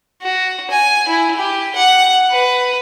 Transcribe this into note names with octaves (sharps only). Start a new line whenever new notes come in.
F#4
G#5
E4
G4
F#5
B4